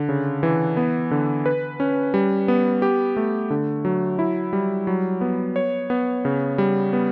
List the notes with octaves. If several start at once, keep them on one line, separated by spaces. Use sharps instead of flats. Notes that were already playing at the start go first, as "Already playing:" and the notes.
Already playing: D3
C#3
E3
B3
D3
B4
C#4
G3
B3
G4
A3
D3
F#3
E4
G3
F#3
B3
C#5
B3
C#3
G3
B3